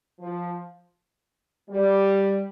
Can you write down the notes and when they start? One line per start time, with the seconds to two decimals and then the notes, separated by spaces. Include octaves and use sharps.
0.20 F3
1.70 G3